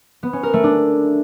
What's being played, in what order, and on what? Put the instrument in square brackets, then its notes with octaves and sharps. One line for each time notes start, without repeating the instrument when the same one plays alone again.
[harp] B3
C#4
A#4
A3
D4